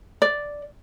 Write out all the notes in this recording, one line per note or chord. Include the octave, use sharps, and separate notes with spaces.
D5